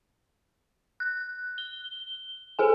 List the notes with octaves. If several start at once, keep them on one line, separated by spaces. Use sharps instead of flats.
F#6
G7
G#4 A4 G#5